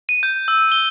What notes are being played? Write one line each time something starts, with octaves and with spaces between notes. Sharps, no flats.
D#7
G6
E6
G7